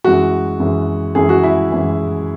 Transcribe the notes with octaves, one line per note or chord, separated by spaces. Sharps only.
F#2 E3 G#3 F#4
F#2 E3 G#3
F#2 E3 G#3 G#4
F#4
E4
F#2 E3 G#3